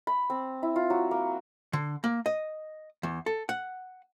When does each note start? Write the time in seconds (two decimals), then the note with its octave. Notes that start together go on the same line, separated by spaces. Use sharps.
0.07 B5
0.30 C4
0.63 E4
0.76 F4
0.90 F#3
1.11 A#3
1.73 D3
2.04 A#3
2.26 D#5
3.03 E2
3.26 A4
3.49 F#5